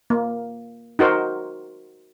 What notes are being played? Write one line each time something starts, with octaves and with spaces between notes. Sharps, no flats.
A#3
D#4 F#4 A#4 C5